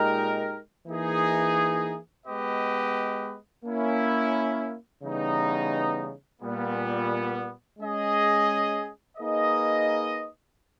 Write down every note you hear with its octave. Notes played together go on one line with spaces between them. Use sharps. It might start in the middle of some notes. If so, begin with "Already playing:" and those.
Already playing: A#2 G#3 D#4 G4 A#4
E3 A#3 D#4 G#4
G#3 B3 G4 B4 D#5
A#3 C#4 E4
C#3 E3 G3 B3 D#4
A#2 G3 B3
G#3 C#4 G#4 D#5
A#3 D#4 G#4 B4 D#5